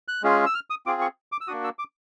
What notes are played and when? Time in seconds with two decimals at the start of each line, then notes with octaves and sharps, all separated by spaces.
0.08 F#6
0.23 G#3 C#4 F4 G#4
0.46 E6
0.55 F6
0.70 D#6
0.86 C4 F4 G#4 D6
1.01 C#6
1.32 D6
1.41 E6
1.48 A#3 D4 F#4 D#6
1.64 E6
1.79 D6